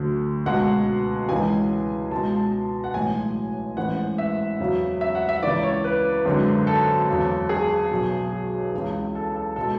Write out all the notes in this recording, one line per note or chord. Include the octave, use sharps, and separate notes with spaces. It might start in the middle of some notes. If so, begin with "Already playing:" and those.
Already playing: D2 D3 F#3
C#2 B2 G#3 F#5
C#2 C#3 E3 G#3 G#5
C#2 B2 G#3 A5
F#5
B1 A2 E3 G#3 G#5
A1 G#2 E3 G#3 F#5
E5
E2 C#3 F#3
E5
F#5
E5
C#2 C#3 E3 D5
C#5
B4
G#1 F#2 D3 G#3
A4
E2 C#3 F#3
G#4
B1 B2 F#3
C#2 C#3 E3
A4
A4
B2 G#3 A4